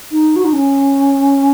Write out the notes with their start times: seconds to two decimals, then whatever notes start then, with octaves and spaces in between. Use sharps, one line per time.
0.12 D#4
0.36 F#4
0.45 D#4
0.53 C#4